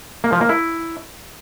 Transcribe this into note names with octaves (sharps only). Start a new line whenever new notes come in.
A#3
F3
A#3
E4